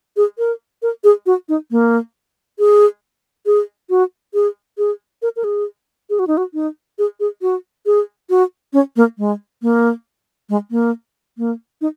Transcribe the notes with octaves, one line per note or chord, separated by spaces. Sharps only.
G#4
A#4
A#4
G#4
F#4
D#4
A#3
G#4
G#4
F#4
G#4
G#4
A#4
A#4
G#4
G#4
F#4
D#4
F#4
D#4
G#4
G#4
F#4
G#4
F#4
C#4
A#3
G#3
A#3
G#3
A#3
A#3
D#4